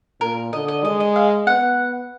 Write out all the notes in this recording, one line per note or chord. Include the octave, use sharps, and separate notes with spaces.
A#2 A#4
D3 D#5
D#5
G#3 D#5
D#5
F5
B3 F#5